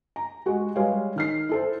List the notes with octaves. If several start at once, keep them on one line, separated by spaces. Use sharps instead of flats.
A#5
G#3 F#4
G3 G#3 B4 C#5 F5
D#3 F6 C7
E4 A4 C5